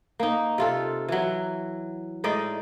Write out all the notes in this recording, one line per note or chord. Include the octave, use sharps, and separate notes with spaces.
A#3 D#4
C3 F4 A4
E3 F#3
A2 G#3 D#4 D5